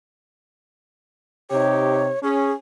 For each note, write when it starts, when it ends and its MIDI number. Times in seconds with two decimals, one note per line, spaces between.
1.50 2.10 48
1.50 2.10 63
1.50 2.10 67
1.50 2.19 73
2.23 2.54 61
2.23 2.52 68